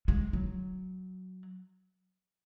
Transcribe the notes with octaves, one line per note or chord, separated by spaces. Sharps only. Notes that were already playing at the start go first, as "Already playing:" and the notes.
G#3
F#3